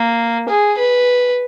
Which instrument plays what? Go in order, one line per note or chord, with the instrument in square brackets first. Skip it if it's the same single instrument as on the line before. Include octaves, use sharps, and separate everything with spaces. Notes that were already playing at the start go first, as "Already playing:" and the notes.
Already playing: [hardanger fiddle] A#3
G#4
B4